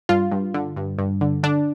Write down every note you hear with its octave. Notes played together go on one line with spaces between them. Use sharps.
G2 F4
G2
D3
G2
G2
D3
D3 D4